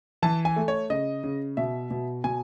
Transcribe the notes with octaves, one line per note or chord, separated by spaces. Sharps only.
E3 A5
G#5
A3
C#5
C#3 D#5
C#3
B2 E5
B2
B2 G#5